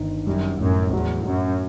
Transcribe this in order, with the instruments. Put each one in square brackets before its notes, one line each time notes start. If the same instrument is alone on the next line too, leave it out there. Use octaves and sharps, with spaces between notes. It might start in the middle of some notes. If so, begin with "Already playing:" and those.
Already playing: [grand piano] G1 D#3
[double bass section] F#2 [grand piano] G3
[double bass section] F#2 [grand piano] A2
[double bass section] E2 [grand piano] F#3
[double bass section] F#2 [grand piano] F#3